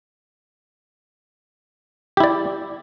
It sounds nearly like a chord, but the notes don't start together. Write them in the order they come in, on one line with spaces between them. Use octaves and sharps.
G4 E4 D5